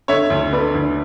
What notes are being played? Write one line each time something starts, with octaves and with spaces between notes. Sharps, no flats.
D3 C#5 E5
D2
D3 B4 D5
D2